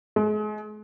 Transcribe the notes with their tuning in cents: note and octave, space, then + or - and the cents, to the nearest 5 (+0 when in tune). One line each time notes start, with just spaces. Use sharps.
G#3 +35